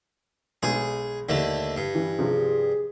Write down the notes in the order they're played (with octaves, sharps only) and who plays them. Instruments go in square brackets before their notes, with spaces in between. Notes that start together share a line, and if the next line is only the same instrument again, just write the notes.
[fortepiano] B1 G#3 [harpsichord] G#4
[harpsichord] D#2 D3 A3
G2
[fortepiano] E3
[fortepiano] C3 F3 C4 [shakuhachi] G#4